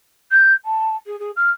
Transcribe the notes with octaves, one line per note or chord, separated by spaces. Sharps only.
G6
A5
G#4
G#4
F6